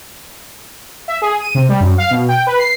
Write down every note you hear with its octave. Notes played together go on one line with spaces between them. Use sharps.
E5
G#4
D#7
C3
G3
F#2
F5
B2
G5
B4
C7